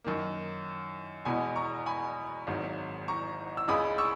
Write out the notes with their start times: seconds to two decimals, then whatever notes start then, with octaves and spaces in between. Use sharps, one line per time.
0.04 F#2 D#3 A#3
1.25 E2 B2 G#3 B3 G#5 B5
1.56 A#5 C#6
1.86 G#5 B5
2.47 G#1 G#2 D#3 F#3
3.08 A#5 C#6
3.57 E6
3.68 C#2 C#3 G#3 B5 D#6
3.98 C#6 E6